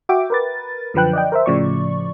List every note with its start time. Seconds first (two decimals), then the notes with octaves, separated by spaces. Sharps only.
0.09 F#4 E5 G5 D6
0.30 A#4 B4 A6
0.94 F#2 D3 F3 B4 G5 F#6
1.13 D5 D#5 G5
1.32 A#4 C5 E5
1.46 A2 C#3 F3 D5 C#6